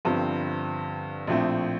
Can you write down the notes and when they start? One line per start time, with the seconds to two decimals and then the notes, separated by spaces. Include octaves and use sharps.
0.05 G1 G2 D3 F3 C4
1.27 A#1 A2 F3 A3 C4